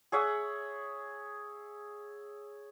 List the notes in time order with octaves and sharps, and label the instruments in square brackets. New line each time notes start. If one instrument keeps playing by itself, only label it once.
[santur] G#4 C#5 E5 F#5